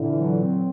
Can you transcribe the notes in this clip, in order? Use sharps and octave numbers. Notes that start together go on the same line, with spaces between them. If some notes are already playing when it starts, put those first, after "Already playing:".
Already playing: A#2 D3 E3
F#3
C4